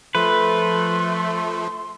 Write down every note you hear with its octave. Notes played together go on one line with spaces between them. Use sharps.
F3 A3 B4 C6